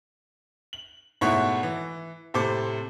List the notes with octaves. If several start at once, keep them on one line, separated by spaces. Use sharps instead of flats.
F#7
G#2 B2 A3 E4 C#5 F#5
E3
A2 C3 A4 C5 D6